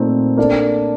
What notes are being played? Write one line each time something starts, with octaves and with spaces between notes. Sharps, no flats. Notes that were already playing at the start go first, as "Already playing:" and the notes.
Already playing: A#2 A3 C4 D#4
A#3 D4 A4 D5